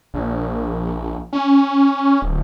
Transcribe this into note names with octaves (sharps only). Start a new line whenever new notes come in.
A#1
C#4
D1